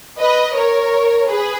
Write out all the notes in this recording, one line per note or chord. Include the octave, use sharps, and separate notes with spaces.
B4 D#5
A#4 C#5
G#4 B4